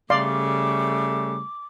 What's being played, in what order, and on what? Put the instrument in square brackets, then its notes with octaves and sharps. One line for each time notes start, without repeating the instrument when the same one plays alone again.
[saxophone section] C#3 G3 A3 [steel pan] D5 F5 C6 [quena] D6